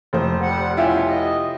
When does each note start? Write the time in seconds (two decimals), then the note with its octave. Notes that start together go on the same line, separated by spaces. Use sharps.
0.13 F1 C5
0.41 G3 F#5
0.77 B2 C#4 E4 F4 G4
1.07 D#5